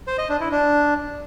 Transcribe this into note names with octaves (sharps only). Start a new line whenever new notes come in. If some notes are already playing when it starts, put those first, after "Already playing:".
C5
D#5
D4
E4
D4